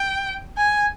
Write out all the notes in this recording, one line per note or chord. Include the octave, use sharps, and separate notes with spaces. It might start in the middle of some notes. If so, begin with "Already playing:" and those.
Already playing: G5
G#5